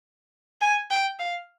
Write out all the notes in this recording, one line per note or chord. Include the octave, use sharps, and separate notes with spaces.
G#5
G5
F5